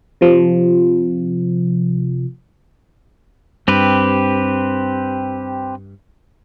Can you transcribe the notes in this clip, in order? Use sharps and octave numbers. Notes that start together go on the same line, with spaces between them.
C3 F3
G2 C4 G4 B4